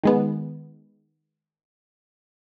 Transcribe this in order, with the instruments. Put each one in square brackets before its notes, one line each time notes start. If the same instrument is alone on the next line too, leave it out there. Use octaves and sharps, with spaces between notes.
[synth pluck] D#3 G#3 B3